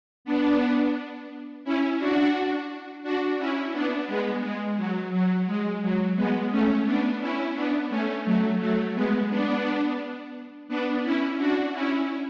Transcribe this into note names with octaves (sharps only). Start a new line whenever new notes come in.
B3 D4
C#4 E4
D4 F#4
D4 F#4
C#4 E4
B3 D4
G#3 B3
G#3
F#3
F#3
G#3
F#3
G#3 B3
A3 C#4
B3 D4
C#4 E4
B3 D4
A3 C#4
F#3 A3
F#3 A3
G#3 B3
B3 D4
B3 D4
C#4 E4
D4 F#4
C#4 E4